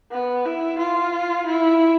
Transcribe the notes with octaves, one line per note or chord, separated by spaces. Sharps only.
B3
E4
F4
E4